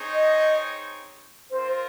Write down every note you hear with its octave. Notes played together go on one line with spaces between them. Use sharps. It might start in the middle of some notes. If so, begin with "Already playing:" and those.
Already playing: C4 D#4 G#4 C#5
D#5
C4 F4 A#4 C5